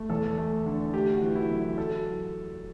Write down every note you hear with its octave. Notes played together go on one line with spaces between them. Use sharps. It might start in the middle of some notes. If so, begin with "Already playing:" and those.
Already playing: A3
E2 A4
A3
D3
A3 G4
F#4
E3
E4
F#2
F#3 A4